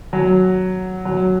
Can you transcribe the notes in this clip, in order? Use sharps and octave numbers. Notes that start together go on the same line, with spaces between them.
F#3
F#3